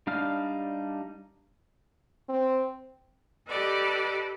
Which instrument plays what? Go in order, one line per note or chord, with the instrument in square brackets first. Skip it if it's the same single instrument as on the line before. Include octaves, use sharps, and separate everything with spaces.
[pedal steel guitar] G3 D4 D#4 F5 F6
[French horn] C4
[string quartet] G4 A4 B4 D5 D#5